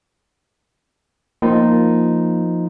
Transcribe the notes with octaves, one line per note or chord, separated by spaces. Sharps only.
F3 A#3 D#4 F4